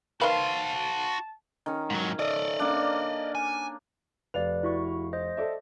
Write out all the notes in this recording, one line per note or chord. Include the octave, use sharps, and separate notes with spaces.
D#3 F#4 B4 C5 F5 A5 C6
D#3 C#4
G#2 F#3
A4 D5 D#5
A#3 C#4 D4
G#5
F1 B4 D5 F5 F7
E4 F#4 C#6
C5 D#5
A4 D5 E5